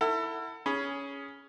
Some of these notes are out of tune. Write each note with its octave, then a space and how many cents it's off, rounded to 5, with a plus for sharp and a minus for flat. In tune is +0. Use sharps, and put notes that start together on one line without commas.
E4 +0 A4 +35 F#5 +0
C#4 +10 G#4 +0 B5 -15